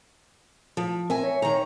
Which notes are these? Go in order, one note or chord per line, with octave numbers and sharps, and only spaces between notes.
F3
C4 A#4 E5 G#5
C#5
D#3 A#5